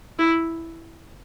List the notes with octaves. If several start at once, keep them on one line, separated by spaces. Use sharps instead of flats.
E4